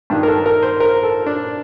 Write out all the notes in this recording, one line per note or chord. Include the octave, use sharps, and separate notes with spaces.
G2 D#3 D4
A#4
A4
A#4
C5
A#4
A4
D4